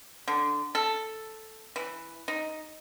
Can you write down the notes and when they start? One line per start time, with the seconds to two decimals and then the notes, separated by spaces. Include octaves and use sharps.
0.28 D3
0.75 A4
1.76 E3
2.28 D#4